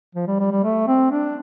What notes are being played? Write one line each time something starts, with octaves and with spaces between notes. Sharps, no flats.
F3
G3
G3
G3
A3
C4
D4